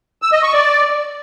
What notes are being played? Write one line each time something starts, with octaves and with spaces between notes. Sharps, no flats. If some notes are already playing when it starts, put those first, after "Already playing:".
E6
D#5
C#6
D5